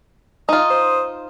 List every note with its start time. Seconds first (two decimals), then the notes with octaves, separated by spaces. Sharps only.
0.49 D#4 F4 D#6
0.70 C5